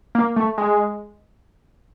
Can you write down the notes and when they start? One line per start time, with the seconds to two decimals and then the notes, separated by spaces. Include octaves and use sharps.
0.15 A#3
0.36 A3
0.58 G#3